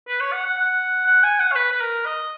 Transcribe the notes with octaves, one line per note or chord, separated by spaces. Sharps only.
B4
C#5
F#5
F#5
F#5
F#5
G#5
F#5
C#5
B4
B4
A#4
D#5